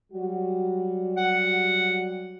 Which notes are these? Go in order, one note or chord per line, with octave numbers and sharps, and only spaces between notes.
F#3 G3 F#4
F#5